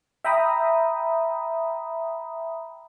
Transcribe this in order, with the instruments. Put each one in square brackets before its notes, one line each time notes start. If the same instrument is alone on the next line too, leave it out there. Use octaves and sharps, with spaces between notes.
[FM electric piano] E5 G5 A#5 B5 D#6